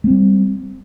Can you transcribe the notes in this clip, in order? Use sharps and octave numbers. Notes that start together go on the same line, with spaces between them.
G3 A3 C4